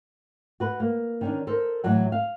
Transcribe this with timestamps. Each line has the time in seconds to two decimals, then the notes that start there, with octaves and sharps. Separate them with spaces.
0.60 F#4 B4
0.80 A#3
1.21 D#3 C#4 D4
1.47 A4 A#4 C5
1.84 A2 E3 F#3 F#5
2.12 F5